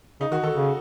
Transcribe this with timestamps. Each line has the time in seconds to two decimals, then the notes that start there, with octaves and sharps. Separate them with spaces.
0.20 C#3 D#4
0.31 D#3 F#4
0.43 D#3 A4
0.54 C#3